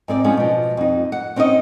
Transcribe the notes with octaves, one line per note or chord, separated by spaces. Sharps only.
G#2 C4 D5
F3 G#3 B3 C#4 D#4
B2 F3
F2 D#4
F#5
C4 C#4 D#4 C#5 D#5